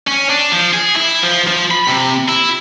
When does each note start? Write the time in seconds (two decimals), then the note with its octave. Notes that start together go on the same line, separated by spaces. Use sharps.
0.07 C#4
0.30 D4
0.52 F3
0.73 G#4
0.96 E4
1.22 F3
1.47 F3
1.71 B5
1.88 C3
2.29 E4